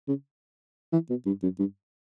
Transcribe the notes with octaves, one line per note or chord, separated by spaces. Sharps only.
C#3
E3
B2
G2
F#2
G2